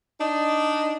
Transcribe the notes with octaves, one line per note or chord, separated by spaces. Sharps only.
D4 D#4